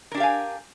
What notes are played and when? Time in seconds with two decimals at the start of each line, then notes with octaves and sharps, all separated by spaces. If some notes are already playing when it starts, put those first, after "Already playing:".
0.12 A#4
0.14 D4
0.17 G4
0.20 F5
0.23 G#5